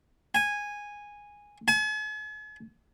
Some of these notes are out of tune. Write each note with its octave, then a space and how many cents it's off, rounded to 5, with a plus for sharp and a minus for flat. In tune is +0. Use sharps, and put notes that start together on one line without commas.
G#5 -10
G#5 +45